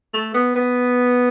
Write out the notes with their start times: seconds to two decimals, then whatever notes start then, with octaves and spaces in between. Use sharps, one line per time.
0.14 A3
0.34 B3
0.56 B3